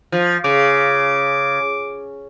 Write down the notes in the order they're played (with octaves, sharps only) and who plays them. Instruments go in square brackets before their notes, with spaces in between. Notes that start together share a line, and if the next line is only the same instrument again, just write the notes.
[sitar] F3
[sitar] C#3 [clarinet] D6